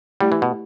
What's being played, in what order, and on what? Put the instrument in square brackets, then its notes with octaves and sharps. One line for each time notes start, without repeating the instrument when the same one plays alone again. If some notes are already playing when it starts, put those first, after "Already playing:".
[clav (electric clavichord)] G3 [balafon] A3 E4 G4 D5
[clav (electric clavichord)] E3
B2